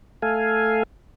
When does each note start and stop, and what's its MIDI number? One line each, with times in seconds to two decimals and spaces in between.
0.22 0.83 57
0.22 0.83 69
0.22 0.83 77
0.22 0.83 80